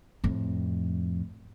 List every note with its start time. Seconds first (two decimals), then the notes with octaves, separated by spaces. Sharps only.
0.24 F2 A2